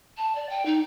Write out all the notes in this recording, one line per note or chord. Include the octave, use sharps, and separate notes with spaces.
A5
D5
G5
D#4